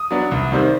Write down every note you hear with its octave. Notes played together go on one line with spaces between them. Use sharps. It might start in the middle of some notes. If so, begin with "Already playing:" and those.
Already playing: D#6
F#3 B3 D4
C2
C3 D#3 G3 C4